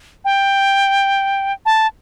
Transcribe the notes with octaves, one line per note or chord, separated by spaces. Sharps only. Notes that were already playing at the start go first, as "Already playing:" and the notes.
G5
A5